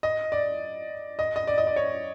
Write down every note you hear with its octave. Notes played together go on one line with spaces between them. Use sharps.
D#5
D5
D#5
D#5
D5
D#5
D5
C#5